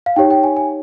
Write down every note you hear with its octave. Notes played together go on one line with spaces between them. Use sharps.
F5
D#4 G4 C#5 G5
G5
G#5
G#5